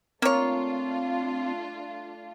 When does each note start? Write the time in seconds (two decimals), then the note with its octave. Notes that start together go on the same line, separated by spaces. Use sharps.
0.22 A3 A#3 C4 D4 F4 C#5